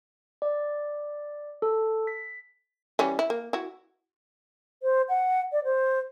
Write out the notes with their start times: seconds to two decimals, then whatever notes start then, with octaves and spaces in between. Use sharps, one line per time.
0.42 D5
1.62 A4
2.07 B6
2.99 E3 G3 C#4
3.19 E4
3.30 A#3
3.53 E4 F#4
4.83 C5
5.09 F#5
5.52 D5
5.64 C5